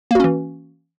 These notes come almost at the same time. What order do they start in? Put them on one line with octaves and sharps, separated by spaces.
A#3 F#4 C#4 E3